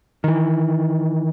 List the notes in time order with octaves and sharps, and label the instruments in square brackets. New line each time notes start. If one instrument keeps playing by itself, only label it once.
[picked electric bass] D#3 E3